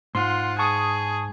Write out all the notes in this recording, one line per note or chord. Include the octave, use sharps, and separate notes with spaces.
G#2 F4 F#5 C6
G#4 A5 C#6 D#6